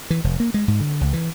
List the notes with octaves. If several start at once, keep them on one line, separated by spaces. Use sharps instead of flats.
E3
F1
A#3
G#3
G#2
D3
C#2
E3